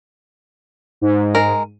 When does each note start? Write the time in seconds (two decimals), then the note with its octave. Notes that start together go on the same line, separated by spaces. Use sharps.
1.01 G#2
1.35 G#3 A#4